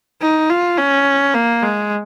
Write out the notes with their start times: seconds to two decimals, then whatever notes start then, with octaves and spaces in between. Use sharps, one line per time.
0.21 D#4
0.49 F4
0.77 C#4
1.34 A#3
1.62 G#3